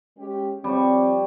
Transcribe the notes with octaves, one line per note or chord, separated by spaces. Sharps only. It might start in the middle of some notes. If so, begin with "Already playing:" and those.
G#3 C#4 G4
F3 G3 C4 C#6